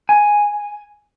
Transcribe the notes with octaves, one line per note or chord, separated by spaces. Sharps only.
G#5